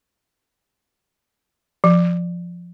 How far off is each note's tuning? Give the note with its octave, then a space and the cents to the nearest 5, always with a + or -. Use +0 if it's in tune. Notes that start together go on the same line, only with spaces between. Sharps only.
F3 +0